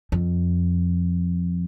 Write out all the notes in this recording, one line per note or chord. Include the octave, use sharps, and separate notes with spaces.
F2